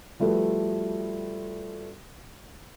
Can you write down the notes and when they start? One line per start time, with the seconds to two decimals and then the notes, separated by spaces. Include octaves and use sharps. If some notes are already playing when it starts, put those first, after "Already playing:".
0.20 F3 G3 A3 F#4 A4 B4